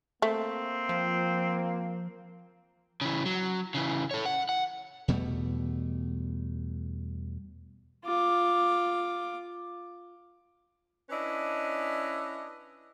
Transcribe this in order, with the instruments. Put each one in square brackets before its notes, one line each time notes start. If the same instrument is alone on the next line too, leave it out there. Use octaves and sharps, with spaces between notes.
[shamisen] A3 [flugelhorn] A#3 [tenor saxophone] C4
[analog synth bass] F3
[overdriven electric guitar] C#3 E3
F#3
C#3 E3
A4 C#5
F#5
F#5
[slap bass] E2 B2 G3 A3
[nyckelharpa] F4 D6
[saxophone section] C#4 D4 E4 B4 D#5